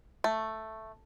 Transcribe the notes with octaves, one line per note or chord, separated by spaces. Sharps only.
A3